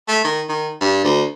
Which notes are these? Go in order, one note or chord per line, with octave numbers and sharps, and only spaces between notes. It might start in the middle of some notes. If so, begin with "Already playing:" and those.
A3
D#3
D#3
G2
D2